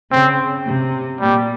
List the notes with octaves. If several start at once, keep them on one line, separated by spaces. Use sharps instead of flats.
C#3 C4
C3
A#2 G3